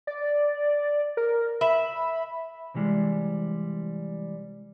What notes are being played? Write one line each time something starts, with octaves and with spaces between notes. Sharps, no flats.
D5
A#4
E5 B5
C3 E3 G3 G#3